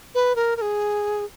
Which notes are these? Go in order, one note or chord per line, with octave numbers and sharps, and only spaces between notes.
B4
A#4
A#4
G#4